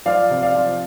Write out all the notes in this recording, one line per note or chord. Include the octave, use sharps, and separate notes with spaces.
F3 D5 F5
C3
D5 F5
F3